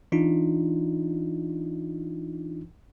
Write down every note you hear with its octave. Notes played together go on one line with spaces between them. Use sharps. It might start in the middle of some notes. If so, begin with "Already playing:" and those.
E3 D4 D#4 F4